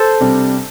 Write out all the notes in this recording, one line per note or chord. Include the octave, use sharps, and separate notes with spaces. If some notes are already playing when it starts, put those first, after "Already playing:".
Already playing: A4 C5
C3 G3 D4